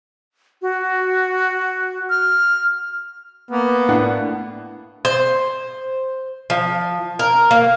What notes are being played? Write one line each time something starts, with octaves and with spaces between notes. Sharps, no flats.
F#4
F6
A#3 B3
A2 D4 F#5
C5
F3
A#4
A#3